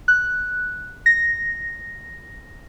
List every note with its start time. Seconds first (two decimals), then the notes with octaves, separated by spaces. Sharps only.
0.08 F#6
1.06 A#6